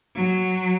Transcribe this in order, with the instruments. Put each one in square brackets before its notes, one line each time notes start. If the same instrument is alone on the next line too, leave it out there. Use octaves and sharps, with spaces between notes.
[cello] F#3